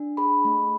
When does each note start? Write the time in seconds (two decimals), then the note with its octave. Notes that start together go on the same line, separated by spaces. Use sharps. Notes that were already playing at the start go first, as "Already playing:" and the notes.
Already playing: D4
0.17 G#4 B5
0.45 A3